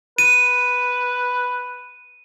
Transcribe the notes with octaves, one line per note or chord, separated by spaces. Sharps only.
B4 D#7